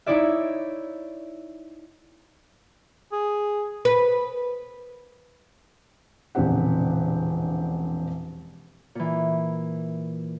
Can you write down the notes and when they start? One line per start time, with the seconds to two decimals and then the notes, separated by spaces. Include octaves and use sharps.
0.06 D#4 E4 C#5 D5 E5
3.12 G#4
3.85 B4
6.35 E1 A#1 C#3 C4 G4 F#5
8.95 A#2 E3